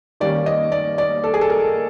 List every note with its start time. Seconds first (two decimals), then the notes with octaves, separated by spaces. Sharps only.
0.20 D#3 G3 A#3 C#4 D5
0.46 D#5
0.72 D5
0.98 D5
1.24 A4
1.34 G#4
1.41 A4
1.50 A#4